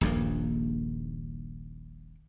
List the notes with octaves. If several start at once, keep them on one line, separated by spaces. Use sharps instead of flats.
D#1 A#1 G2 A#3